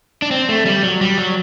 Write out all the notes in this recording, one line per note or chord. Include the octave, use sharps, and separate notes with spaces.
D4
C4
A3
G3
F#3
G3
F#3